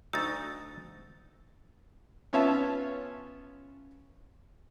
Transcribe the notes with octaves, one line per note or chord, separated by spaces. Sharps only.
D2 D#4 F#4 E6 A6
B3 C#4 F4 C#5 E5 A5